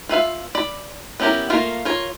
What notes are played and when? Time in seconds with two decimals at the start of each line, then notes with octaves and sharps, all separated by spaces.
0.09 F4 B4 E5 F5
0.55 D5 B5
1.20 B3 C#4 E4 G4 A#4
1.50 A3 A#3 F4 A#4
1.85 F4 A#4 C#5